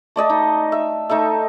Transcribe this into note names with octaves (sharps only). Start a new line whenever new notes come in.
A3 D5 D#5 A5
D#4
E5
A3 D#4 A4 E5